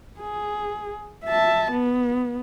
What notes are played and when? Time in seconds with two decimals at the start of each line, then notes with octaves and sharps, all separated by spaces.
0.19 G#4
1.25 E5 A5
1.71 B3